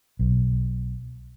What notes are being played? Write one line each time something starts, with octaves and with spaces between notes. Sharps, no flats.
B1